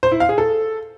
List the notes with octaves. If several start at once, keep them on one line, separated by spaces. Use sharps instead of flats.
C5
E4
F5
G#4
A4